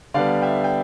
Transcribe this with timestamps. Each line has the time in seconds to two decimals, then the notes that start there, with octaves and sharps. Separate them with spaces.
0.14 D3 G3 B3 D5 F5
0.42 E5 G5
0.64 G5